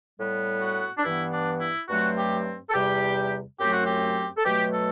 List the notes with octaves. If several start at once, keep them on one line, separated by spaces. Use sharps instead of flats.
A2 G3 B3
F#4
D4
G2 E3 B3 E4
D4
E4
G2 F#3 A3 C4 F#4
G4
A4
E2 C3 G3 G4
F#2 F#3 A3 C4 G4
F#4
G4
A4
B2 F#3 A3 G4
A4